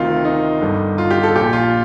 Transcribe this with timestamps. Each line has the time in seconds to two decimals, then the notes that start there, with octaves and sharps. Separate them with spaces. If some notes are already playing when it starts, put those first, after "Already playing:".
Already playing: D2 C3 D#3 F4
0.25 D#4
0.61 G1 G2 D3
0.98 F4
1.11 G4
1.23 A4
1.35 A#1 A#2 G4
1.53 F4